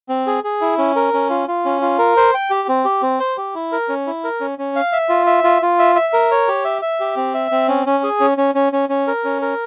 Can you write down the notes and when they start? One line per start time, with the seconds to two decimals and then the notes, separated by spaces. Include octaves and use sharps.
0.09 C4
0.27 G#4
0.44 G#4
0.61 E4
0.78 C#4
0.96 A#4
1.13 C#4
1.30 F4
1.48 F4
1.65 C#4
1.82 F4
1.99 A#4
2.17 C5
2.34 G5
2.50 G4
2.68 C4
2.85 G4
3.02 C4
3.20 C5
3.37 G4
3.55 E4
3.72 A#4
3.89 C#4
4.07 E4
4.24 A#4
4.41 C#4
4.59 C#4
4.76 F5
4.93 E5
5.09 F4
5.26 E5
5.44 F4
5.62 F4
5.79 E5
5.95 E5
6.13 A#4
6.31 C#5
6.48 G4
6.65 E5
6.82 E5
7.00 G4
7.16 C4
7.34 E5
7.51 C4
7.68 C#4
7.86 C#4
8.04 G#4
8.20 C#4
8.38 C#4
8.55 C#4
8.73 C#4
8.89 C#4
9.07 A#4
9.24 C#4
9.42 A#4